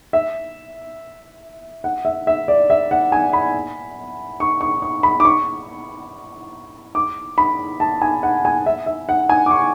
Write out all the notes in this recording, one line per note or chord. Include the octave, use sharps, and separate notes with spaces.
E5
F#5
E5
E5
D5
E5
F#5
G#5
B5
C#6
C#6
C#6
B5
D6
C#6
D6
B5
A5
G#5
F#5
G#5
E5
E5
F#5
G#5
D6
C#6